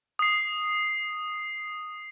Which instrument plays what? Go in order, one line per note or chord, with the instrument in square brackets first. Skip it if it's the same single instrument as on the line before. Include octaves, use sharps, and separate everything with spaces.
[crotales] D#6 C7